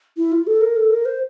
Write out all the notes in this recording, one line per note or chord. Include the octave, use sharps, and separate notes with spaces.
E4
F4
A4
A#4
A4
A#4
C5